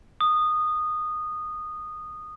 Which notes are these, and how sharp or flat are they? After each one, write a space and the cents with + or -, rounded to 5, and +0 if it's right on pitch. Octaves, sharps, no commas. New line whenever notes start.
D#6 -15